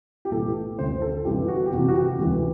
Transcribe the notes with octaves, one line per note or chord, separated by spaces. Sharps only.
G4
B1 A2 E3 A4
D2 D3 C5
A4
G1 G2 E3 G4
F#4
G4
F#1 E2 C3 E3 F#4
F#4
G4
E1 D2 C3 E3